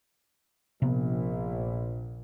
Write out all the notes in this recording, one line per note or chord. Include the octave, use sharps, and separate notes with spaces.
A#1 C3 B3